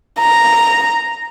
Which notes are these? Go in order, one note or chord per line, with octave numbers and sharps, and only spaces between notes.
A#5